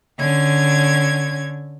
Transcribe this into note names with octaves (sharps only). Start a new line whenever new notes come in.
D3 C#4 G#6